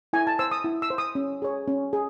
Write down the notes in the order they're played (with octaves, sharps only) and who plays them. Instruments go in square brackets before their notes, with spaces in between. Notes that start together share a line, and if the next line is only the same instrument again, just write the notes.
[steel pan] E4 G#5
A5
C5 E6
D#6
E4
E6
C5
D#6
C#4
G#4 C#5
C#4
G#4